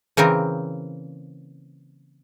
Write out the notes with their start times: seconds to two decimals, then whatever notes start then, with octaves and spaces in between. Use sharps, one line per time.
0.17 C#3 E3 A#3 C4 A#4